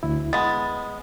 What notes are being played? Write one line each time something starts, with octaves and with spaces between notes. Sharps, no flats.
D2 E4
G#3 B3 A6